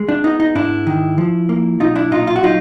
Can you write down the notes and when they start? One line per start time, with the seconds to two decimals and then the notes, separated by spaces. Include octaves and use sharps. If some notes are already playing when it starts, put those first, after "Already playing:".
Already playing: G#3
0.09 D4
0.24 B3 D#4
0.40 D#4
0.55 G#2 D4 E4
0.87 D#3
1.18 F3
1.49 A#3
1.80 B1 D#4 F4
1.95 D4 E4
2.11 A#2 D#4 F4
2.27 F4
2.36 F#4
2.43 F#3 D#4 F4